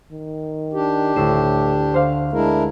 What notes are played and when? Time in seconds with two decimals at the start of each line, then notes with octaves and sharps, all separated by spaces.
0.11 D#3
0.73 D4 G4
1.16 D2 A2 C7 E7
1.94 D3 C5 F5
2.33 G#3 D4 E4 A#4